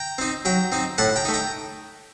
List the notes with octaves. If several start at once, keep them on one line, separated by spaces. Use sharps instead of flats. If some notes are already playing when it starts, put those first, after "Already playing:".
Already playing: G5 A#5
C4 D#4
F#3 G5 A#5
C4 D#4
A2 F#5 A5
G5 A#5
A3 D#4
G5 A#5